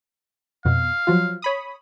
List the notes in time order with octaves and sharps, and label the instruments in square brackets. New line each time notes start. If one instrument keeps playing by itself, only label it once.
[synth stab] F2 B2 [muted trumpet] F5
[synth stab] F3 F#3 F4
C#5 B5 D#6